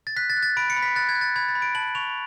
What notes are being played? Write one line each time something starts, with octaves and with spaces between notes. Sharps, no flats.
A6
F#6 B6
A6
F#6
A6
B5 D7
C#7
B5
B6
F#6 A6
G#6
F#6
A6
B5 G#6
A6
B5
D7
A5 F#7
C#6 F7